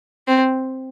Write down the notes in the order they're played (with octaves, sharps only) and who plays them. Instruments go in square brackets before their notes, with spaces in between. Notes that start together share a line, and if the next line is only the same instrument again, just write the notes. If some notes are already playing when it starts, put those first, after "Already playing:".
[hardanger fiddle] C4